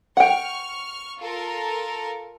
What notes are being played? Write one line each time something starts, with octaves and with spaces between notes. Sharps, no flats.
F#5 G5 C#6 F6
F4 A4 A#4